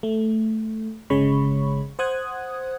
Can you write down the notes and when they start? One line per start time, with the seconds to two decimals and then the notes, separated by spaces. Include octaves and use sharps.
0.03 A3
1.10 G1 C#3 G#3 C#5 B5 C#6
1.99 C5 F#5 D#6 F#6 G#6